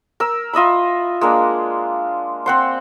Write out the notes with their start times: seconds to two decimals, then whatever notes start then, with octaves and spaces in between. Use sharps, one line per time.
0.20 A#4 E6
0.53 F4 D#5 E5 B5
1.21 G#3 A#3 D4
2.46 C4 F#5 C6